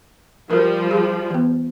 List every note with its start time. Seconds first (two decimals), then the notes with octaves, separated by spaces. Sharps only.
0.51 F3 G3 A#4
0.91 G#4
1.30 E3 B3